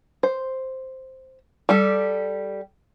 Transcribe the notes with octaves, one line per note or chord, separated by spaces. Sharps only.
C5
G3 G4 A4